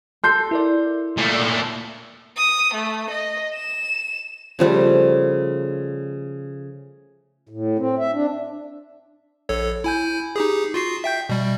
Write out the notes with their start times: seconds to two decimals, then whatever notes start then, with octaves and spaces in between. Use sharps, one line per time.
0.24 A4 C6 G6 C7
0.51 E4 A#4 D5
1.17 A#2 A3
2.37 D#6
2.74 A3
3.10 D#5
3.55 E7
4.59 C#3 F3 G3 A3
7.49 A2
7.79 C4
7.98 E5
8.13 D4
9.49 A#1 A4 C#5
9.84 E4 G#5 G6
10.36 D#4 G4 G#4
10.74 F4 F#4 C7
11.04 E5 G5 G6
11.29 B2 G3